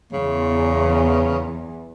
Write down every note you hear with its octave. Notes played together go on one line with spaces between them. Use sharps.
E2 C#3